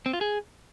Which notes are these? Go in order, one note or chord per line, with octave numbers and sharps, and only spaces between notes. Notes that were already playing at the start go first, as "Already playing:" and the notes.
C4
F4
G#4